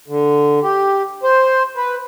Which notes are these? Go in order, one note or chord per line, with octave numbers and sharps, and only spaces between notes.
D3
G4
C5
B4